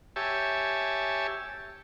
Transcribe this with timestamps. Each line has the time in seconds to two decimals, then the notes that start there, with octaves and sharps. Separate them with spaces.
0.16 G4 C#5 E5 G#5 A5